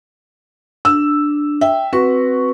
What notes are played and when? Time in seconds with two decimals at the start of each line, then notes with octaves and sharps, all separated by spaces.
0.85 D4 E6
1.61 E5 G5
1.93 C4 F#4 B4